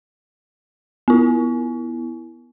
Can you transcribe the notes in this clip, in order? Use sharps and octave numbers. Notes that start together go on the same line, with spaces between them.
B3 E4